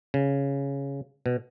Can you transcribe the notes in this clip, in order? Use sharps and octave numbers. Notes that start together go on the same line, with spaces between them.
C#3
B2